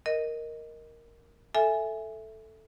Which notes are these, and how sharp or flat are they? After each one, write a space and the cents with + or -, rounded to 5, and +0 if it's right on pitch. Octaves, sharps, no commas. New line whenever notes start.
A#4 +0 D#5 +0
A4 +0 E5 +0 G#5 +0